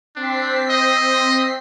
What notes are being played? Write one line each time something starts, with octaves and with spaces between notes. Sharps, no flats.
C4 D4 B6 C7
D#5